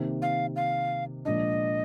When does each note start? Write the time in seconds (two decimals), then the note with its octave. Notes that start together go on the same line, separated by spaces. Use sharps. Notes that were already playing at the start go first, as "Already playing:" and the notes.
Already playing: C3 D#3 A#3
0.22 F5
0.56 F5
1.25 A#2 F3 G#3 D4 D#5